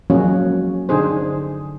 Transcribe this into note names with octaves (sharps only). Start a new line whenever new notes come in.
F3 F#3 G#3 A#3 C#4 F#4
D3 D4 D#4 G#4 C5